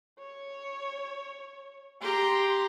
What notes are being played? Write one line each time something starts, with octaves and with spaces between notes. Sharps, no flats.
C#5
G4 A#5 C6